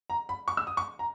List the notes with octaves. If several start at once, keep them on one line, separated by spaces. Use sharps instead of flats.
A#5
B5
C#6
E6
D#6
C#6
A#5